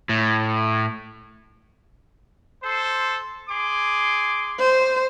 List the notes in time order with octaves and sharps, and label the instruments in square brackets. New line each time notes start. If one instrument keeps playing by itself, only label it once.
[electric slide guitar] A2
[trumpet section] A4 C5
G#4 C6 D6
[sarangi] C5